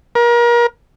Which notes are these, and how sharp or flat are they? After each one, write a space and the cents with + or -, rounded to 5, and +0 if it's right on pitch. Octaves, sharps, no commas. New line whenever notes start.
A#4 +35